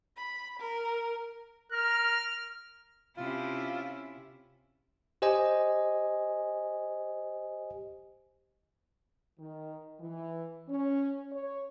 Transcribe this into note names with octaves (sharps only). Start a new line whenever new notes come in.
B5
A#4
A#4 F6
C3 C#4 E4 F4
G4 C5 D#5 G#5
D#3
E3
C#4
C#5